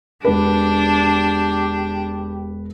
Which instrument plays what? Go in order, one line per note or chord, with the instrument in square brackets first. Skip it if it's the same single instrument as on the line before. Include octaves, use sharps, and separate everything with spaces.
[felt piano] E1 B4 [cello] D4 [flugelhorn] G4